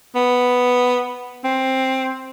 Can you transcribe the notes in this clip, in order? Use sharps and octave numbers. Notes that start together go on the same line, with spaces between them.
B3
C4